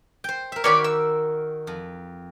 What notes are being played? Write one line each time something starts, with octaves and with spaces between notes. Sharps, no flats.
C5 G5
A#4 E5
D#3 F#4 A#4 C#5 D5 B5
E6
F2